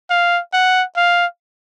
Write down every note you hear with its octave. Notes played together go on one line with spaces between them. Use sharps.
F5
F#5
F5